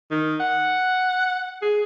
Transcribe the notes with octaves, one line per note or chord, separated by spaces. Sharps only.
D#3
F#5
G#4